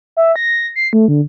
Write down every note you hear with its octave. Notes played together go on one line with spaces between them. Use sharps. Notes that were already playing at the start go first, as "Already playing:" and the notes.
E5
A#6
C7
A3
D3